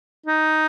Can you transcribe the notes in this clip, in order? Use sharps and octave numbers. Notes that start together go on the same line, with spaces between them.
D#4